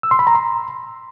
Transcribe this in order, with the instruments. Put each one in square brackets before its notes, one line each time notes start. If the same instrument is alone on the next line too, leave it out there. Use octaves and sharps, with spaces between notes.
[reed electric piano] E6
C6
B5
A#5
C6